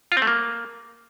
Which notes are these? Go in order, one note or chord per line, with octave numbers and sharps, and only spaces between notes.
F4
C4
A3
A#3